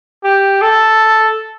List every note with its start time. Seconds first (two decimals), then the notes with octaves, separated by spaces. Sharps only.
0.24 G4
0.62 A4